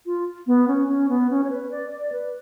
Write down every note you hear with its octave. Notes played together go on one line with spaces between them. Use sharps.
F4
B3
C#4
C#4
B3
C#4
C#5
B4
D5
D5
B4